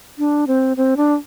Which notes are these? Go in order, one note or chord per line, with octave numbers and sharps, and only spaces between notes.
D4
C4
C4
D4